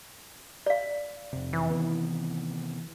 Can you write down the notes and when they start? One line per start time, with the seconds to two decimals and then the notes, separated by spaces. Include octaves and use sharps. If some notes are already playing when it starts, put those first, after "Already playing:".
0.66 D5 F5
1.33 F2 C3
1.53 E3
1.70 C3 D#3 B3